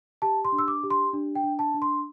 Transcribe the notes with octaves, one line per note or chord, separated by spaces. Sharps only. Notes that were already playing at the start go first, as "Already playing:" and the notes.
G4 A5
C6
D4
E6
D6
G4
C6
D4
G5
D4
A5
D4
C6